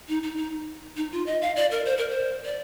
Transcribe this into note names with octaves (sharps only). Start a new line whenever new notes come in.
D#4
D#4
D#4
D#4
F4
D#5
F5
D5
A#4
C5
A#4
C5
D5